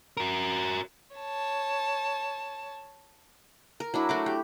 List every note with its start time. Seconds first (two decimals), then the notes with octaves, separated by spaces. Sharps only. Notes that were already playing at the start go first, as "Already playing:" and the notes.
0.17 F#4 A#4
1.16 C#5 A5
3.80 A#4
3.94 F#3 D4 E4
4.09 A3 F#4 D6
4.26 G4